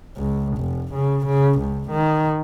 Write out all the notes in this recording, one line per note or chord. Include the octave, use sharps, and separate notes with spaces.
C#2
F1
C#3
C#3
C#2
D#3